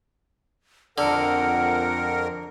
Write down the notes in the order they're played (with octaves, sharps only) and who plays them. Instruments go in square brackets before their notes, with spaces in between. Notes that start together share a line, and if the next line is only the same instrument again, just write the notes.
[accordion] F2 A#4 [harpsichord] D3 [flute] F#5